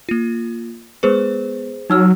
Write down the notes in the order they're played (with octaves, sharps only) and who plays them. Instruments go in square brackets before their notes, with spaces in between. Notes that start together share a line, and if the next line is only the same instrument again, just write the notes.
[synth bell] A#3 F4
[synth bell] G#3 B3 B4 [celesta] G#4 C5
[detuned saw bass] F#3 [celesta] D#4 E6 F6